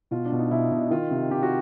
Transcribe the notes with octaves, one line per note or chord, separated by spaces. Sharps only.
B2 F4
D4
B2
D#4
B2 E4
B2
D#3 F4
C3
C3 G4
F#4